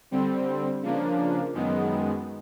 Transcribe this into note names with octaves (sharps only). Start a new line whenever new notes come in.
D3 G3 C4
C#3 F3 A#3 D4
F#2 D#3 G#3 B3